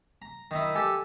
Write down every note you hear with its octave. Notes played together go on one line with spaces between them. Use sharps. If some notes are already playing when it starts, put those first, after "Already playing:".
A#5
D#3 D#4 E4
G4 A4 G#5